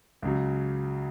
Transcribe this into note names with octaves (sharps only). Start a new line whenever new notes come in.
C#2 C#3 F#3